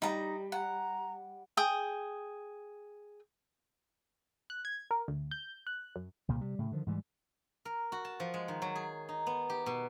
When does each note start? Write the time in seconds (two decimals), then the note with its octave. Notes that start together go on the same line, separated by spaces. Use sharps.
0.02 G3 D#4 A#5
0.52 F#5 A#5
1.57 G#4 G5 D#6
4.50 F#6
4.65 G#6
4.91 A#4
5.08 D2
5.31 G6
5.67 F#6
5.96 F#2
6.28 C2 A#2 C#3
6.41 C3 G3
6.59 A2 C#3
6.72 D3 D#3 F3
6.86 G#2 E3 F#3 G3
7.65 A#4
7.92 F#4
8.05 A5
8.20 F3
8.34 G#3
8.48 D#3
8.62 F#3
8.76 G#4
9.09 D#4
9.27 B3
9.50 G4
9.66 B2